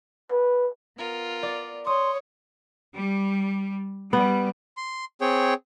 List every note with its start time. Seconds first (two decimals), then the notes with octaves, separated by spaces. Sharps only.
0.32 B4
0.98 B3 F4 A#4
1.43 D5
1.87 C#5 C6 D#6
2.94 G3
4.13 G3 B3
4.77 C6
5.21 C4 G#4 C#5 G5